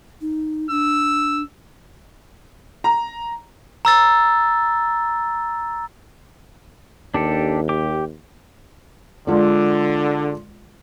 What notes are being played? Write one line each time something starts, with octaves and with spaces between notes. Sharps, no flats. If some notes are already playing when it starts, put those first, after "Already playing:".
D#4
D4 E6
A#5
A#5 E6 A6
D#2 D4 G4 A4
G4 D6
D3 G#3 F4 D5